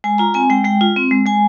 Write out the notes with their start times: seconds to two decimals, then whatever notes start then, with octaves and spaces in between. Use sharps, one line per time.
0.04 G#3 G#5
0.18 F4 A#5
0.34 C4 G#5
0.50 G#3 G5
0.64 G#3 G5
0.81 F4
0.96 C4
1.11 G#3
1.26 G#3 G#5